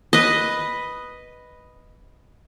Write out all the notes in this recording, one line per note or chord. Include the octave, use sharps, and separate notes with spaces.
B4 D#5